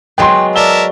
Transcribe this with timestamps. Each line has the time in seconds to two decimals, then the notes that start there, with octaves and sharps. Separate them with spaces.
0.18 F#3 G#3 B3 G5 C6
0.56 A#4 D5 E5 A5 G7